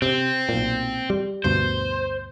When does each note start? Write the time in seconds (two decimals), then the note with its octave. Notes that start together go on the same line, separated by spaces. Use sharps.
0.02 C3 C4
0.49 B1 A#2
1.10 G3
1.44 D2 G2 B2 C5